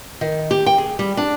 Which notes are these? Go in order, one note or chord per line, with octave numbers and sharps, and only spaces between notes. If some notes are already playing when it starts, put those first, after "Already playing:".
D#3
G4
G5
G#4
G3
D4